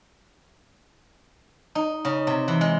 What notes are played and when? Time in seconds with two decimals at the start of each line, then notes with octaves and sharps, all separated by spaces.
1.75 D#4
2.05 C#3
2.27 C3
2.48 E3
2.61 G#3